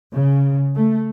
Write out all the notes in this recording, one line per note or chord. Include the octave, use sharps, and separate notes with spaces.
C#3
A3